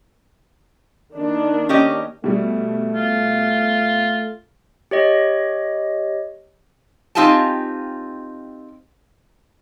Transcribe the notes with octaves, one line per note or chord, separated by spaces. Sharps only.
D#3 A#3 D4
C#4 G4 D#5
B2 G3 A3
F4
G4 C#5 D#5
C4 D#4 F4 G4 G#5 A5